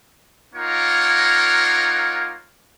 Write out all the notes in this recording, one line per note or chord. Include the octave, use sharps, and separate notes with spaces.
A#3 D#4 F4 A#4 C#5 F#5